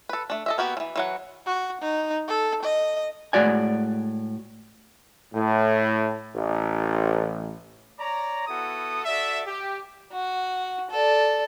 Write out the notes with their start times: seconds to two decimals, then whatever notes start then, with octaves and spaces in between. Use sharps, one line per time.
0.09 A4 B4
0.30 A3 D4
0.46 A4 D#5 E5
0.58 A#3 B3 F#4 G4
0.77 E3 F3
0.96 E3 F#3 F#5
1.46 F#4
1.81 D#4
2.28 A4
2.63 D#5
3.33 A2 G#3 F#4 D5 G#5
5.34 A2
6.35 A1
7.98 C#5 D5 A#5
8.47 B3 E4 F#4 A4 D#6
9.05 F#4 A4 D5 E5
9.46 G4
10.12 F#4
10.90 A4 D5